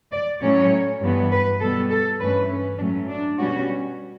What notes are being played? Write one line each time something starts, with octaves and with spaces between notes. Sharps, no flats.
D5
A2 F#3 A3 C#4 C#5
G2 E3 B3
B4
B2 G3 B3 A4
A4
G2 E3 A3 C#4 B4
C#4
A2 F#3 A3 C#4 D4
D4
B2 G3 C#4 F#4